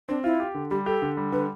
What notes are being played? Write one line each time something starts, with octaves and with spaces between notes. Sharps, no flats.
C4 D4
E4 F4
G4
D3
G3 G4
G4 A4
D3
G3
D3 B4